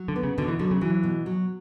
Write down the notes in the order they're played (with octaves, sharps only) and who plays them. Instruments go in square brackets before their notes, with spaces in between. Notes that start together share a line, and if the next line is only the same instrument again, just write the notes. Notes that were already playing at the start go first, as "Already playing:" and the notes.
Already playing: [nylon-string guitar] F#3
[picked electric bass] D3
[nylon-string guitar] B3
[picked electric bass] C#3
[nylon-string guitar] B2 [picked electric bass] D3
[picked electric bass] E3
[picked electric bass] D3 [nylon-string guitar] F#3
[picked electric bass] C#3
[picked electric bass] E3 [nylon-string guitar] F#3
[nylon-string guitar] B2
F#3